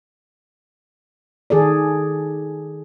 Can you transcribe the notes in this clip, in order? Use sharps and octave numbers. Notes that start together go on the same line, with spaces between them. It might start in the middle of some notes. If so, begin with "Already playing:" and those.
D#3 G#4 A4 D5